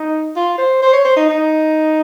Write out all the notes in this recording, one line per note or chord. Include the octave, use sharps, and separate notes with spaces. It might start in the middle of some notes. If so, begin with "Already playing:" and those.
Already playing: D#4
F4
C5
C5
C#5
C5
D#4
D#4